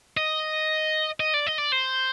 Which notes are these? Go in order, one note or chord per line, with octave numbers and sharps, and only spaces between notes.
D#5
D#5
D5
D#5
D5
C5